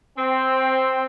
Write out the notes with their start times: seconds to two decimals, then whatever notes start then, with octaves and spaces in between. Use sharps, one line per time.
0.18 C4